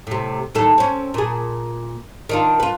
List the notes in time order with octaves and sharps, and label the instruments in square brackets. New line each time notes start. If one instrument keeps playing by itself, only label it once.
[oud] A2 C3
D#2 A2 A4
C4 C#4
A#2 G#4
D#3 D4 F4
F4 B4